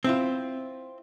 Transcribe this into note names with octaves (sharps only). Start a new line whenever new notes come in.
C4 E4 F4